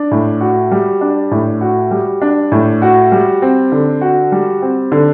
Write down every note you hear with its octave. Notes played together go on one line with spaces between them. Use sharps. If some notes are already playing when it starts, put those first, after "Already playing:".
Already playing: D4
A2
F#4
G3
D4
A2
F#4
G3
D4
A2
F#4
G3
C4
D3
F#4
G3
C4
D3